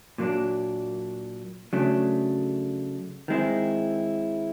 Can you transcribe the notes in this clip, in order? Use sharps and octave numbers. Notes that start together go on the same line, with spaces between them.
A#2 F#3 A#3 D4
C#3 F#3 A3 D4
D#3 G#3 C4 E4